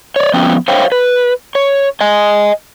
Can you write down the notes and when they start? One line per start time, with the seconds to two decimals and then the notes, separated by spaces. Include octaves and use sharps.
0.16 C#5 D5
0.34 F3 B3 C#4 G5
0.68 C5 C#5 F5 G5
0.92 B4
1.55 C#5
2.01 D#5 G#5